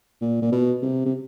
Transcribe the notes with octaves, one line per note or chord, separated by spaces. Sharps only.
A#2
A#2
B2
C3
C3